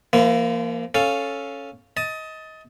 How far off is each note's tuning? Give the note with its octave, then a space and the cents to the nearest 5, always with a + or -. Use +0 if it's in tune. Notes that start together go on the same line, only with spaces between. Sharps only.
F3 -35 A#3 +0 E4 +15
C#4 +0 A4 +0 F5 +0
D#5 +25 A5 +0